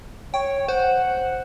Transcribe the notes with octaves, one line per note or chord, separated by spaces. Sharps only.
C#5 G5
C5 F#5